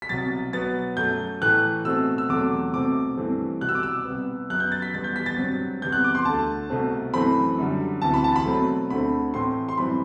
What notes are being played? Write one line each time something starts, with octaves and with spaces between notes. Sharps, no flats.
B6
C2 B2 F#3 A6
B2 F#3 B3 A6
F#2 F#3 A3 G6
A2 E3 A3 F#6
B2 A3 C4 E6
E6
E2 C3 F#3 A3 D6
C2 B2 A3 C4 D6
G2 E3 A3 C4
C2 B2 G3 F#6
E6
D6
E6
C2 C3 G3 B3
F#2 F#3 B3 F#6
G6
A6
B6
E2 B2 G3 B3 A6
G6
B6
A6
G2 F#3 C4
E2 C3 G3 B3 G6
F#6
D6
C6
D2 D3 A3 A5
C2 B2 A3 C4
F#2 E3 A3 C4 B5
F#2 D3 G3
D2 C3 E3 A5
B5
A5
B5
B2 F#3 A3 C4
D2 D3 A3 C4 B5
A2 E3 A3 C4 C6
C6
F#2 E3 G3 C4 B5